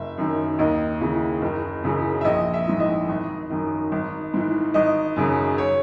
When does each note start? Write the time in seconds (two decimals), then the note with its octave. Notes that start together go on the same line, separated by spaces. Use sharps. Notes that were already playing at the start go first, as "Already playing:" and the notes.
Already playing: F#1 E5
0.18 F#2 D#3
0.59 D#2 D#5
1.01 C#3 E3
1.42 F#1
1.83 F#2 C#3 E3
2.21 E5
2.25 A#1 D#5
2.54 E5
2.67 G#2 E3
2.80 D#5
3.09 G#1
3.51 F#2 D#3
3.92 G#1
4.34 G#2 E3
4.74 G#1 D#5
5.16 F#2 C#3
5.58 C#5